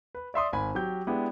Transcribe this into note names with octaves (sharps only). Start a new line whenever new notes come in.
B4
D5 E5 C6 D#6
G#1 G#5 B5
F#3 G4 G6
G#3 B3 D4 E4 G4